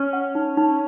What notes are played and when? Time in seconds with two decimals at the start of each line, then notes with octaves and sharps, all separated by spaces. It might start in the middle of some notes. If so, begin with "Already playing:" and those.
Already playing: C#4
0.13 F#5
0.35 D#4
0.57 D#4